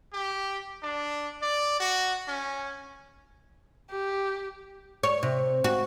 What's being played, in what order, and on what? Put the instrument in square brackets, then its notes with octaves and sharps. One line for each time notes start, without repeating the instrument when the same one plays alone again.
[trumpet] G4
D4
D5
F#4
C#4
[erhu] G4
[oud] C#5
C3
F#4